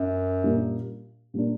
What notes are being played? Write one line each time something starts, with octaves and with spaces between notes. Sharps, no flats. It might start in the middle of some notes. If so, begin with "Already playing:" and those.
Already playing: F#2
A#2 G3 A#3 D4
A#2 G3 A#3 D4